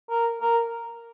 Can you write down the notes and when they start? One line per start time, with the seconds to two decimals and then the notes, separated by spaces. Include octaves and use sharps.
0.10 A#4
0.41 A#4